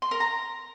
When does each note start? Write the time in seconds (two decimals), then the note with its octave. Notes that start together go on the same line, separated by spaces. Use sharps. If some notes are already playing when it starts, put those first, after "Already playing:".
0.02 C6
0.11 A#4
0.20 A#5